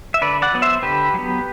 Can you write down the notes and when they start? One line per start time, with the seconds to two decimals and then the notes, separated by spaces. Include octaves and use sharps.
0.14 E5
0.21 D3 B4 D5
0.42 D5 F#5
0.53 F#3 B3
0.62 C5 E5
0.83 D3 G4 B4
1.14 F#3 B3